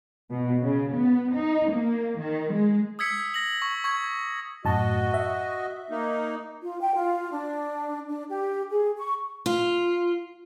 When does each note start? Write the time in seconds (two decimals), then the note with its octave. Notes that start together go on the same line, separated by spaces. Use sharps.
0.30 B2
0.62 C#3
0.94 B3
1.34 D#4
1.72 A#3
2.19 D#3
2.52 G#3
2.99 D#6 E6 G#6 B6 C#7
3.34 A#6 F#7
3.62 C#6
3.84 C#6 G#6
4.65 F#2 A2 F#4 D#5 A5
5.14 E5
5.91 A#3 D#4
6.63 F4
6.81 G5
6.95 F4
7.32 D4
8.08 D4
8.29 G4
8.70 G#4
8.98 C#6
9.46 F4